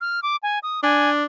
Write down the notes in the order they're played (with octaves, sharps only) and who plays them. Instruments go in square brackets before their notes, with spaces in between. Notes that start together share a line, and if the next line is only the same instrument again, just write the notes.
[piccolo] F6
D6
G#5
D#6
[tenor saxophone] D4 [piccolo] G#5